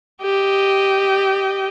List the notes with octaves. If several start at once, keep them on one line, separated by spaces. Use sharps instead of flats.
G4 D#5